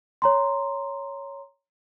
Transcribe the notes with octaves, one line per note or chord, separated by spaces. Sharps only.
C#5 A#5 C6